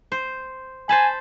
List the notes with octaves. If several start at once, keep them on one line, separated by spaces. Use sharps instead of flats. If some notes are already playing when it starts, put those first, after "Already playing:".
C5
C5 G#5 A5 B5